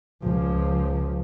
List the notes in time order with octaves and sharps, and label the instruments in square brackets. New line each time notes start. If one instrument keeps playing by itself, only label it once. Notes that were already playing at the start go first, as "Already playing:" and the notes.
[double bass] C#2 F3